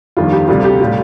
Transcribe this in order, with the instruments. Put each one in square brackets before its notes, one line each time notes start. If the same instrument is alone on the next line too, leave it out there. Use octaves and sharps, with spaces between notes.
[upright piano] G1 F2 D#3 G3 F4
G4
D2 C3 G3 F4
G4
A2 G3 F4